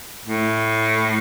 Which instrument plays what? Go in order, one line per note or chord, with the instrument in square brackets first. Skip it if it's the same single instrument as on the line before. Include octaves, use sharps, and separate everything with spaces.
[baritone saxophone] A2